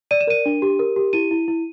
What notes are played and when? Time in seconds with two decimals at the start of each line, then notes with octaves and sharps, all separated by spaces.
0.11 D5 D#7
0.21 E7
0.27 A#4 D#7
0.46 D4
0.62 G4
0.79 A#4
0.96 G4
1.13 E4 D#7
1.31 E4
1.48 E4